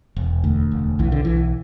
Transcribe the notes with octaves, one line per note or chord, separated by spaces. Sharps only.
E1
D2
E1
B1 E3
D3
B1 E3